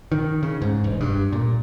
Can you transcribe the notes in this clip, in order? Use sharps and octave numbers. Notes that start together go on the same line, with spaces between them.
D#3
C#3
G#2
E1
G2
A#2